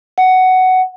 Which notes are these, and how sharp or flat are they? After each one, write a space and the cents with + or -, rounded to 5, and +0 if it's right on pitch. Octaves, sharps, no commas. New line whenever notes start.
F#5 +10